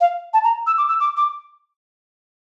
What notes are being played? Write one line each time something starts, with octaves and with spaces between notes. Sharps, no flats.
F5
A5
A#5
E6
D6
E6
D6
D6